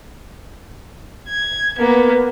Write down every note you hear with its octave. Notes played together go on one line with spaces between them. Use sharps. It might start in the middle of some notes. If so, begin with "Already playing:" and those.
G#6
A#3 B3